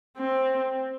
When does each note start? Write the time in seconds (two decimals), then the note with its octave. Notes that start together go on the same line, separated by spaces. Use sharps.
0.17 C4